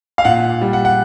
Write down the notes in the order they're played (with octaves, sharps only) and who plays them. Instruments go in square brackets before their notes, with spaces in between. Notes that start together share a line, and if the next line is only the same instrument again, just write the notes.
[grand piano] F5
A#2 F#5
G3
F#5
F#5